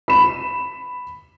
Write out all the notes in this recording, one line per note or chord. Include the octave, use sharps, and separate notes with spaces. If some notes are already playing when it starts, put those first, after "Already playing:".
B5 E7